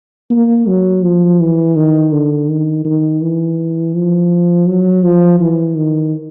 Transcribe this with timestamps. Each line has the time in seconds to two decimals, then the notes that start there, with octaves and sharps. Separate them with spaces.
0.30 A#3
0.67 F#3
1.03 F3
1.40 E3
1.76 D#3
2.12 D3
2.49 D#3
2.85 D#3
3.22 E3
3.95 F3
4.67 F#3
5.04 F3
5.40 E3
5.76 D#3